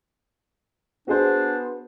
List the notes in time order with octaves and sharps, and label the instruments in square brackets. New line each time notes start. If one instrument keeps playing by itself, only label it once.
[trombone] B3 [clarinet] D4 [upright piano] F#4 G#4 C5